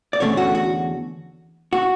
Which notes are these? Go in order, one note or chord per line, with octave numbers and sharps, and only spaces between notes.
D5
E2 D3 A3 C#4 C#5
F#4
F#4
F#4